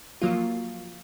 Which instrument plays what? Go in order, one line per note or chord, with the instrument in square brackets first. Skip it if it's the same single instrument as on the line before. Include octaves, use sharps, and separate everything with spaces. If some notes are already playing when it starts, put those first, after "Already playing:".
[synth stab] F3 F#3 A#3 F4